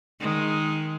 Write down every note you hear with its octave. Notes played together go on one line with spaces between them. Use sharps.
D#3 G#3